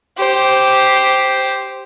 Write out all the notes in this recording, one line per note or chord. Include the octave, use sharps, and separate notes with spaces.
G4 C5